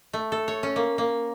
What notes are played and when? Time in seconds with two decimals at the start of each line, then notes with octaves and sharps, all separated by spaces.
0.13 A3
0.32 A4
0.48 C#5
0.63 C#4
0.76 A#3
0.98 A#3